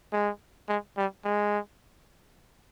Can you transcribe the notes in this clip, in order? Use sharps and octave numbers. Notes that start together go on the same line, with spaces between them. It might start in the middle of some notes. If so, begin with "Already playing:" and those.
G#3
G#3
G3
G#3